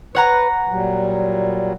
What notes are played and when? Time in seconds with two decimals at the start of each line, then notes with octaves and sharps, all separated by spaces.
0.15 B4 C#5 F#5 A#5
0.68 A#2 F#3 G3